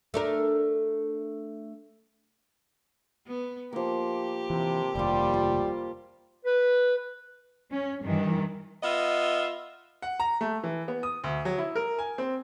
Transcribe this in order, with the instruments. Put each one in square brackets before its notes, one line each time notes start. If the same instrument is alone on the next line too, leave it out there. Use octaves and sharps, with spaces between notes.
[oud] A3 D4 A#4
[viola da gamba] B3
[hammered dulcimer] F3 A#3 [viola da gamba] G4
[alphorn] C3 [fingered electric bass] E3
[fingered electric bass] F1 D#2 [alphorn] G3 [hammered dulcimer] A#3 F4
[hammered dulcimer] F4
[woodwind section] B4
[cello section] C#4
G2 D#3 E3
[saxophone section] B3 F4 D#5 E5
[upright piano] F#5
A#5
A3
E3
B3
D#6
D2
F#3
E4
A#4
G#5
C4